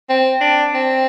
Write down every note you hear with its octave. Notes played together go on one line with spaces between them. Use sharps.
C4
D4
C4